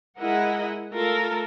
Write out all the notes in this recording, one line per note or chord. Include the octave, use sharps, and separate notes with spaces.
G#3 E4 A#4 D#5 F#5
A3 F4 A4 A#4